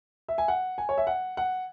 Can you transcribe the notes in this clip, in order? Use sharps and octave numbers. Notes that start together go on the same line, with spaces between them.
E5
G#5
F#5
G#5
C#5
E5
F#5
F#5